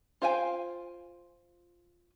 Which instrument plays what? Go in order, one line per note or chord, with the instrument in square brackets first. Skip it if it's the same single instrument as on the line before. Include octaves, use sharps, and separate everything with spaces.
[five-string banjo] F4 C5 F5 G5 G#5